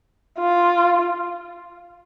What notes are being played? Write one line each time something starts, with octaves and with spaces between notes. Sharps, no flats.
F4